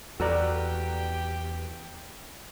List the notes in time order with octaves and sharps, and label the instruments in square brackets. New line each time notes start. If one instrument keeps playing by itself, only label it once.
[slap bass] E2 [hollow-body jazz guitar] F#4 D5 [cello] G4 [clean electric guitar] A4 B4 A#5